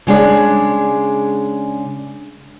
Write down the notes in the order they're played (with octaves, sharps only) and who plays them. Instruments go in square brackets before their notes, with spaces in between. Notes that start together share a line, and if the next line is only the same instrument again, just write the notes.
[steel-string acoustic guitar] C#3 G#3 D4